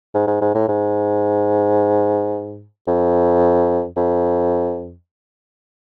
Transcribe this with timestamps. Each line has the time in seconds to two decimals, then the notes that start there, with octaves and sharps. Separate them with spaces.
0.14 G#2
0.27 G#2
0.41 G#2
0.55 A2
0.68 G#2
2.87 F2
3.96 F2